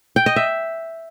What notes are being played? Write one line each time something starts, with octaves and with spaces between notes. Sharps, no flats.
G5
D#5
E5